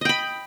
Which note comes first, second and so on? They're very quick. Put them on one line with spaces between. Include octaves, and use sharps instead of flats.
D#5 G5 B5